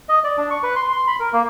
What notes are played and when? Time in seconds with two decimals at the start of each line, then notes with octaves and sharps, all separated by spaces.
0.09 D#5
0.24 D5
0.38 D4
0.50 C#6
0.63 B4
0.76 C6
0.93 C6
1.07 B5
1.20 A#4
1.33 A#3